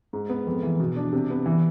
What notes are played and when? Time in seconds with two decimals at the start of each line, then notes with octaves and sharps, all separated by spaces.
0.13 G#2
0.29 B3
0.47 F2
0.63 E3
0.80 B2
0.96 D4
1.13 C3
1.30 B3
1.46 E3